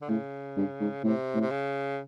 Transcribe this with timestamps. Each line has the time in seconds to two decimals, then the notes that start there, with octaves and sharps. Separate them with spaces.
0.01 D3
0.09 A2 C#3
0.57 G2
0.80 G#2
1.04 A2 C3
1.35 A2
1.41 C3
1.51 C#3